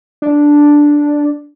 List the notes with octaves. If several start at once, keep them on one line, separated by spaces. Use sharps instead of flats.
D4